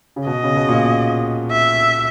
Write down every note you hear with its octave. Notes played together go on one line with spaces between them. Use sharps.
C#3
B2 D#5
C#3
B2
A#2
E5